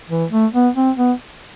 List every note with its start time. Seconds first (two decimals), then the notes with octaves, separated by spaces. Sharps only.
0.10 E3
0.30 A3
0.53 B3
0.75 C4
0.97 B3